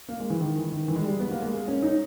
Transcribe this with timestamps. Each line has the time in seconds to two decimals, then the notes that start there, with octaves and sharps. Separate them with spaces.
0.08 A#3
0.20 G#3
0.30 E3
0.40 D#3
0.56 E3
0.72 D#3
0.88 E3
0.96 G#3
1.04 G3
1.20 B3
1.31 A#3
1.42 G#3
1.54 A#3
1.68 C#4
1.82 D#4